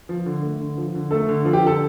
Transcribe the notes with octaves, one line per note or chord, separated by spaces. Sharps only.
F3
D3
A3
D3
F3
D3
A3 A4
D3
F3
G4
D3 A4